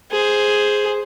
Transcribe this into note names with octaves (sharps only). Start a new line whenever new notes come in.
G#4 C5